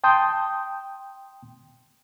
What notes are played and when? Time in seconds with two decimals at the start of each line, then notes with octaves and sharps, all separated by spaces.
0.04 G5 A5 C6 D#6 G6